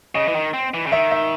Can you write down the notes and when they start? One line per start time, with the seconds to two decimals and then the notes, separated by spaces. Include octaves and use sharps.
0.15 C#3 D#5
0.28 E3
0.35 D#3
0.54 C4
0.74 E3
0.86 C#3
0.92 D#3 E5
1.11 E5